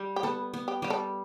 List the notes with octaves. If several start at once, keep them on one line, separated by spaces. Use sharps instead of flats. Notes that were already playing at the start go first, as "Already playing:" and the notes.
Already playing: G3
G4
B3 A4
B3
G4
G3 G4
A4